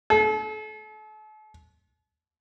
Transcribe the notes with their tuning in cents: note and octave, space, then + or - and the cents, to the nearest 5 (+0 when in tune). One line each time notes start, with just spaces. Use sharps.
A4 -40